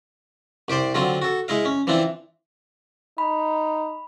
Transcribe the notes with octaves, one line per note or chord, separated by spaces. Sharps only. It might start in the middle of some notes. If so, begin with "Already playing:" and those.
C2 G4 C5 D5 C6
D3 F#3 C4 F4
F#4 A4
G#3 E4 D#5 F5
C#4
E3 F3 C4 D4 E4
D#4 B5